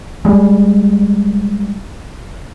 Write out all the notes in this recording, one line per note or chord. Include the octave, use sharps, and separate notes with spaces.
G3 G#3